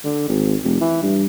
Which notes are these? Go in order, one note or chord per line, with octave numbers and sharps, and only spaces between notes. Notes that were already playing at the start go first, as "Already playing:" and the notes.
D3
G#1
F1
E3
G2